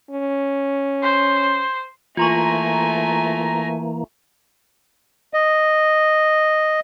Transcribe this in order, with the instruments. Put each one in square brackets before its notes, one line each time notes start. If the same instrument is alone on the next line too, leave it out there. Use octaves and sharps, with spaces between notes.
[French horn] C#4
[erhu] C5
[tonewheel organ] E3 A#3 [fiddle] A3 G#5 [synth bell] F4 C6 C#6 [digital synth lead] A#5
[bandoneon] D#5